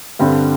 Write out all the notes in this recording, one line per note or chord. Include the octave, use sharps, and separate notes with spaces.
G2 D3 G3 C4